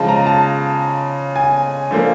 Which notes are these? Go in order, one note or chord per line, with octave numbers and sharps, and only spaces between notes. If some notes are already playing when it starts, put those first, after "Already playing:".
Already playing: C#3 F3 G#3 A5
A#5
A5
G#5
D3 F3 A#3